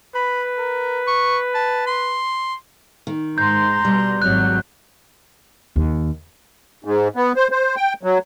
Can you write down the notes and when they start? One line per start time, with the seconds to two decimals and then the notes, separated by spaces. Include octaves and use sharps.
0.15 B4 B5
0.58 A#4
1.07 C#6
1.55 A5
1.87 C6
3.07 D#3
3.38 G#2 A#5 C6 G6
3.85 B2 G3
4.22 G#1 F#3 F#6
5.76 D#2
6.84 G#2
7.16 B3
7.36 C5
7.51 C5
7.76 G5
8.03 F#3